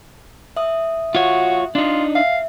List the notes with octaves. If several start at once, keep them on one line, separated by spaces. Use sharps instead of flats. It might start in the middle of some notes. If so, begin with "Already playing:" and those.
E5 D#6
F4 F#4 C#5
D4 D#4 F4
E5 F5